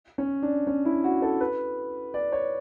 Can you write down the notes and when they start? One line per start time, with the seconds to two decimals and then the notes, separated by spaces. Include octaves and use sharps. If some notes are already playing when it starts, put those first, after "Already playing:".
0.18 C#4
0.43 D4
0.67 C#4
0.85 E4
1.04 F#4
1.22 A4
1.40 B4
2.14 D5
2.32 C#5